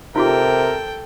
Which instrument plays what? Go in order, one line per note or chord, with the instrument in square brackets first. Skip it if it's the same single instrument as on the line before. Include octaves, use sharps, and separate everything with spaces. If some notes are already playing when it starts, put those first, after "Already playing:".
[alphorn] C3 [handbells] D#4 F4 G4 [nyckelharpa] A4 G5 [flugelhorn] A#4